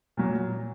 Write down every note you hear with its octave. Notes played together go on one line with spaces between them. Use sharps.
A#2 F#3